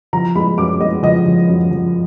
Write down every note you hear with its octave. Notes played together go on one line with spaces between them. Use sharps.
F3 A#5
G#3 B5
F#2 D6
G#3 D#5
F3 D#5
F3
F#2
F3